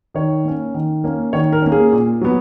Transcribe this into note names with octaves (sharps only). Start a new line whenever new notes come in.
D#3 C#5
A#3 C#4
D#3
A#3 C#4
D#3 C#5
A#4
A#3 C#4
G#4
A#2
F#3 B3